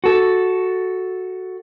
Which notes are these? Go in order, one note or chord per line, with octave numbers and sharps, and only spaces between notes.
F#4 A4